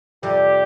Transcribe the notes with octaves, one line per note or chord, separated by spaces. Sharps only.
F2 C3 G3 G4